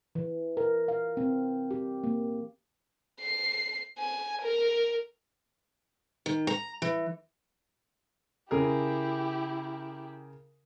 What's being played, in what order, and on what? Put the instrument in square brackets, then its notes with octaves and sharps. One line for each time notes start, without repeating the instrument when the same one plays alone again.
[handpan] E3
A#4
F5
C4
G4
A#3
[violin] C7
G#5
A#4
[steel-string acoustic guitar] D#3
A#5
E3
[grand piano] C#3 G#4 A#4 [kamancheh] E4 G4